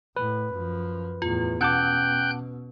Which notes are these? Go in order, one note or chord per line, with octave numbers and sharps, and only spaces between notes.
A2 B4
F#2 F3
E2 A2 F4
B2 C#4 F#5 G5 A5 D6 F#6 G6